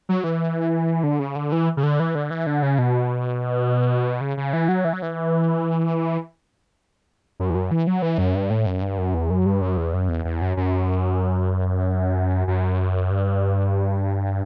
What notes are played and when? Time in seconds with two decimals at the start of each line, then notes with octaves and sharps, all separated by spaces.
0.09 F#3
0.24 E3
1.04 D3
1.19 C#3
1.36 D3
1.52 E3
1.77 C#3
1.83 D3
2.00 E3
2.15 D3
2.31 E3
2.47 D3
2.63 C#3
2.78 B2
4.21 C#3
4.37 C#3
4.53 E3
4.69 F#3
4.85 E3
4.93 F#3
5.02 E3
7.40 F#2
7.50 E2
7.55 F#2
7.71 E3
7.87 F#3
8.02 E3
8.18 F#2
8.35 G2
8.50 A2
8.66 F#2
8.82 G2
8.98 F#2
9.14 E2
9.30 F#2
9.46 G2
9.62 F#2
9.77 E2
9.94 F#2
10.09 E2
10.25 E2
10.41 F#2
10.57 F#2
12.47 F#2
13.11 G2